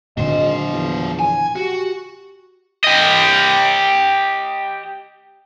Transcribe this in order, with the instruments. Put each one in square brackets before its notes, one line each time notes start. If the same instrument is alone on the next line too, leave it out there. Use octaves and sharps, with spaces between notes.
[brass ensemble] G#1 D#5 [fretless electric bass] A#2 D3 [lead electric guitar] F#3 C5
[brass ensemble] E2 F3
[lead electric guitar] G#5
[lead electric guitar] F#4 [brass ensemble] G4
[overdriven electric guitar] G4 D#5